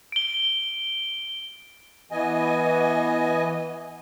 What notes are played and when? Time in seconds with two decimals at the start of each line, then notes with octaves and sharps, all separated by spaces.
0.12 D7 G7
2.11 E3 B3 D#5 G#5